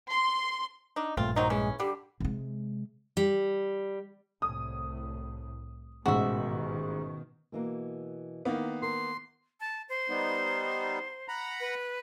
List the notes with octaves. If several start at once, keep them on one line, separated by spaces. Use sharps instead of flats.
C6
D4 D#4
A#1 G2 A#2 A3 C4 F4
D#3 F#3 D#4 C5
E3 G#3 C#4
D3 G3 G4
C3 G#3
G3
C2 A2 D#6
A1 G#2 B2 D#3 F#4 E5
B2 E3 A#3
D#3 A#3 B3 E4
A#4 C6
A5
C5
G3 B3 D#4
F#5 A#5 B5
B4